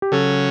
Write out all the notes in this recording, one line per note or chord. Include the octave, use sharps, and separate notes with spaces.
G4
C#3 F#3 C#4 A4